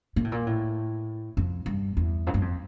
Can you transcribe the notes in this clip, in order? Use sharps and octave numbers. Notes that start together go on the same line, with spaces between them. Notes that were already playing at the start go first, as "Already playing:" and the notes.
A#2
A2
A#2
A2
F2
G2
E2
F2
G2
F2